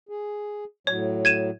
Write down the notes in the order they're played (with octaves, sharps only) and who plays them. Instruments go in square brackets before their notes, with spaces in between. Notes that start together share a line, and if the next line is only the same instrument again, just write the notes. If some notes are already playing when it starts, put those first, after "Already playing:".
[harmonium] G#4
[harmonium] A2 F#3 [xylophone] C#5
[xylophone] G#6 D#7 E7